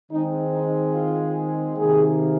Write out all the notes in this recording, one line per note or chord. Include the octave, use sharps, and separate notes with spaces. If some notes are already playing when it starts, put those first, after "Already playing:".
D#3 G#3 C4 D#4
D#4
F4
C3 D#3 A#3 G#4